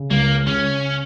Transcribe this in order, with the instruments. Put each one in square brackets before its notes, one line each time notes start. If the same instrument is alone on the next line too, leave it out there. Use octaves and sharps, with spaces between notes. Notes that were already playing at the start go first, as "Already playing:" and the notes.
Already playing: [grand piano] C#3
[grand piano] C#2 [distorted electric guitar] A#3
[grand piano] C#3 [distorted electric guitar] C#4